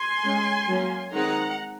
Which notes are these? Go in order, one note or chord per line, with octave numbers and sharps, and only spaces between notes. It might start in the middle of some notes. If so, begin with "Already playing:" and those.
Already playing: G#5 C6
G#3 C#4
F#3 A#3 C#4
D#3 G#3 C4 D#4 F#5 A#5